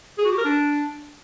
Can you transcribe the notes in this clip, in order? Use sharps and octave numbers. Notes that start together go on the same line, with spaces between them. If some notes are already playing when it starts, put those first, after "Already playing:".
G#4
F#4
G4
A#4
D4